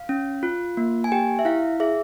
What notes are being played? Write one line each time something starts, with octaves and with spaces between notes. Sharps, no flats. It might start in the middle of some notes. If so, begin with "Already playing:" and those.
Already playing: F5
C#4
F4
A#3
G#5
G4 G5
E5
E4 F5
G#4 E5